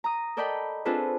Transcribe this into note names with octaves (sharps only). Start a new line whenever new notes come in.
A#5 D#6
A4 A#4 D5 D#5 G5 B5
C4 D4 F4 G#4 A4 B4